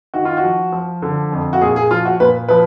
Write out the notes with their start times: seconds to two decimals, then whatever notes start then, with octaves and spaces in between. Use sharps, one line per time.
0.14 D#3 F#4
0.25 F4
0.37 F#4
0.43 F3
0.72 F3
1.02 D3
1.32 F2
1.53 F#4
1.61 A#2 G#4
1.76 G#4
1.91 F3 F4
2.05 F#4
2.20 A#2 B4
2.48 F3 B4